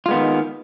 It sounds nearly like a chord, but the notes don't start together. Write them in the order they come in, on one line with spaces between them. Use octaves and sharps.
F4 G#3 B3 D#3